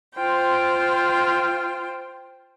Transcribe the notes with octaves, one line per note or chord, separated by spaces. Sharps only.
F4 C5 G5